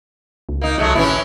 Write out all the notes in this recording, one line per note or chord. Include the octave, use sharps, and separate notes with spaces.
C#2
A#3 D#4
C2 F#3 G#3 A3
A1 E3 C#4 E4